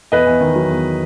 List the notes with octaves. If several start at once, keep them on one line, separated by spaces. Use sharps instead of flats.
E2 B4 D#5
E2
D#3
F#3
E2